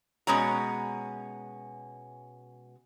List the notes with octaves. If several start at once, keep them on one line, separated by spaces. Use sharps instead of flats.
B2 G#3 C#4 C#5 A#5